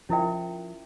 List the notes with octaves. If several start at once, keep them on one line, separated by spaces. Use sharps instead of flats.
F3 C#4 E4 A#4 E5 G5